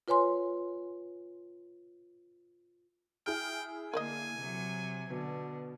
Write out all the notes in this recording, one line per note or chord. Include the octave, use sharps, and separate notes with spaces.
F4 B4 C#5 G#5 C6
E4 G#4 G5 F6
D3 A#3 A#4 D5 D#5 G#5
C3 F#3
B2 D3